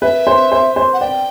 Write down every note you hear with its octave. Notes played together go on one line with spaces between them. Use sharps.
B4 E5
C5
C5
C5
F#5
D5 G5